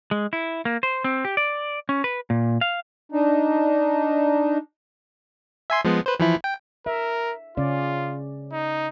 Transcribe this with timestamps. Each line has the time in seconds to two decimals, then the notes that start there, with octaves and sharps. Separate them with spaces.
0.11 G#3
0.33 E4
0.65 A#3
0.83 C5
1.04 C4
1.25 G4
1.37 D5
1.89 C#4
2.04 B4
2.30 A#2
2.61 F5
3.12 D4 D#4
5.70 E5 G#5 C6
5.85 F3 G#3 B3
6.06 B4 C5
6.20 E3 F3 E4
6.44 G5
6.86 A#4 E5
7.57 C#3 C#4 F4 D5
8.52 D#4